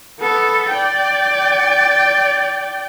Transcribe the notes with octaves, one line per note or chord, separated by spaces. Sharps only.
B3 A4
D5 G5